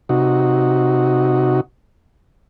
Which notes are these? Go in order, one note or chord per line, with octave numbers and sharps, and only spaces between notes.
C3 D#4 F#4